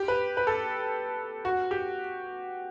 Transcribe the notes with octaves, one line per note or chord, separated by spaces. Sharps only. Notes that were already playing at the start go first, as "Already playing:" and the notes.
Already playing: G4
B4
B4
A4
F#4
G4